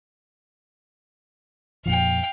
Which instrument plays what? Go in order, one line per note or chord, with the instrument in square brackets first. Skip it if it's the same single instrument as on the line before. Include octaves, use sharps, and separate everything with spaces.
[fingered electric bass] F2 A#2 F3 [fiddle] F5 G5